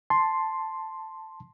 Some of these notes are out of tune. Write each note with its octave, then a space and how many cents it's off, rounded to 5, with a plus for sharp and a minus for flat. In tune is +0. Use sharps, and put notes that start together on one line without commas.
A5 +0 C6 +0